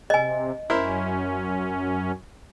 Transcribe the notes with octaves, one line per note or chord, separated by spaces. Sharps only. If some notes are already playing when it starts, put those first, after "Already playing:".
C3 D#5 G#5
F#2 C#4 E4 A#4 C5